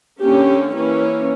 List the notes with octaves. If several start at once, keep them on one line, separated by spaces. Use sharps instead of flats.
D3 A#3 C#4 G4
E3 A#3 C#4